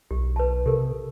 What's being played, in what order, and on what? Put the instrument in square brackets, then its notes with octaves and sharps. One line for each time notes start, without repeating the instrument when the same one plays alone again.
[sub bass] B1 [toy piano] G4
[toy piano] B4 A5
[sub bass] C3 [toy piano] G4 A4 A#4